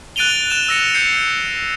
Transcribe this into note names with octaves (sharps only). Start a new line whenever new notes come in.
F#6 A6 D7 D#7 F7 G7
F#6 E7
E6 A#6 C#7
G6 C7 C#7